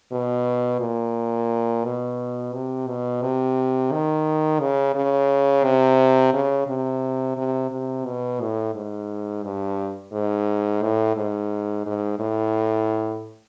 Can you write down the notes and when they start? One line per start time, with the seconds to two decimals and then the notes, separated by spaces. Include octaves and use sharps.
0.12 B2
0.80 A#2
1.84 B2
2.53 C3
2.87 B2
3.22 C3
3.92 D#3
4.60 C#3
4.95 C#3
5.64 C3
6.33 C#3
6.68 C3
7.37 C3
7.71 C3
8.06 B2
8.41 A2
8.75 G#2
9.43 G2
10.12 G#2
10.82 A2
11.17 G#2
11.86 G#2
12.20 A2